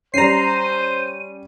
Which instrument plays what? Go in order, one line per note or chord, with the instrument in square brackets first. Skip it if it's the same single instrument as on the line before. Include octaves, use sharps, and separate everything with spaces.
[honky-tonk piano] G3 C#4 [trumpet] C5 [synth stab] A#5 C7 [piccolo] D#7